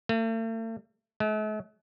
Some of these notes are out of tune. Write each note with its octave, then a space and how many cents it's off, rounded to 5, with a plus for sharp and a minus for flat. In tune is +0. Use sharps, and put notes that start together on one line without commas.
A3 +45
A3 -45